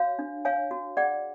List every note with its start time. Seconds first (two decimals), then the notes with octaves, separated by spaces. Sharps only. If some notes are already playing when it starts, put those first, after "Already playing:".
Already playing: F#4 C#5 F5
0.19 D4
0.45 C#5 F5 G#5
0.71 F#4
0.97 G#4 D5 F#5